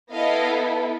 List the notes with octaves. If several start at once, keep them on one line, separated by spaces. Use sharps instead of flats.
B3 E4 A4 D#5 F5